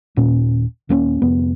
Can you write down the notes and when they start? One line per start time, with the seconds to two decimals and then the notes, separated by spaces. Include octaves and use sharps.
0.16 D#1 A#2 C#4
0.89 D#1 A#3 C4 C#4
1.22 F1 B3